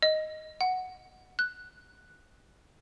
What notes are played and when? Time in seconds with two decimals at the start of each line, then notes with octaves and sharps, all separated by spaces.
0.03 D#5
0.61 F#5
1.39 F#6